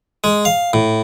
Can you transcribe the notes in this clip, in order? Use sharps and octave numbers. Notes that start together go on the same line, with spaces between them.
G#3
F5
A2